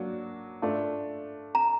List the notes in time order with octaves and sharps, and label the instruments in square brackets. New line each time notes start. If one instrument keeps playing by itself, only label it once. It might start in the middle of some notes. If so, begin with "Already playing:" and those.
Already playing: [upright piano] F#3 A#3 D4 F#4
A3 D4 F4
[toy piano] A#5